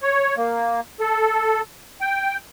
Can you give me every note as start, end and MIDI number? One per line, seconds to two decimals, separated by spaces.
0.03 0.35 73
0.37 0.80 58
1.00 1.61 69
2.01 2.37 79